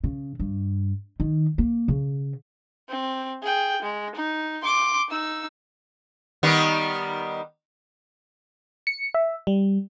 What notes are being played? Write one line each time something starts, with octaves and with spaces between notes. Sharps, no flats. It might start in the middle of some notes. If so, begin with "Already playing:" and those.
C#3
G2
D#3
A#3
C#3
C4
G#4 G5
G#3
D#4
C6 D6
D#4 E6
D#3 G3 B3
C#7
E5
G3